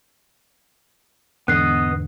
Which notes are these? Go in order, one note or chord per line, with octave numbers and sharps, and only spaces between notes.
E2 G#2 D3 B3 D#5 F#6 C7